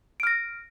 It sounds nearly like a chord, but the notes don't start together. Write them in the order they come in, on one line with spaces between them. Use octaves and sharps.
D7 F6 A#6